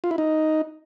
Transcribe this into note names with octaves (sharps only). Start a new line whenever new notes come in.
F4
E4
D#4